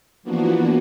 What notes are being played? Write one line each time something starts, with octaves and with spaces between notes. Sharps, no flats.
E3 F3 A#3 B3 D4 F#4